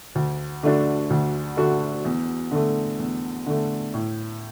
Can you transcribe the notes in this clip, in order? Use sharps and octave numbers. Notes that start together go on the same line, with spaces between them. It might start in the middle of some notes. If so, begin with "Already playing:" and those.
D2
D3 A3 D4 F#4
D2
D3 A3 D4 F#4
E2
D3 A3
E2
D3 A3
A2